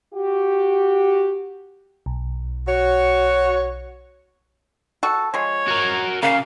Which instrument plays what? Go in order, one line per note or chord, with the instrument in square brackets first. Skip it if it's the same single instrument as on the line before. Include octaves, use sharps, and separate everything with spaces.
[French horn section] F#4 G4
[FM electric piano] B1
[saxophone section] F#4 C#5
[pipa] F#4 A4
[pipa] F3 G#3 [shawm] C#5
[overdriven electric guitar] F#4 A#4
[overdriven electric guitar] C#3 [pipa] A#3 [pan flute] F5